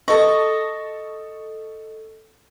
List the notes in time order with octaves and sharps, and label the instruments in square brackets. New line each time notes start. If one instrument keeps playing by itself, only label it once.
[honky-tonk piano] A4 C#6 [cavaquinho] D#5